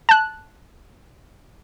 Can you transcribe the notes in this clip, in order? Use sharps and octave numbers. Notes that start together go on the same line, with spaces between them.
A5 F#6